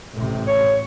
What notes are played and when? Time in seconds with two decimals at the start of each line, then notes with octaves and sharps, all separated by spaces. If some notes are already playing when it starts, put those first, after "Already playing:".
0.14 A1 C3
0.47 C#5